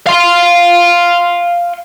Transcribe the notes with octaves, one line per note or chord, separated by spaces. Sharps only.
F5 C6